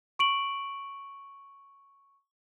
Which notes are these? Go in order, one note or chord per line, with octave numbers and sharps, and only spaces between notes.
C#6 D7 F#7